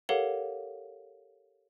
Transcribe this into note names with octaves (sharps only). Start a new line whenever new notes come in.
G4 A4 A#4 C#5 F5 F#5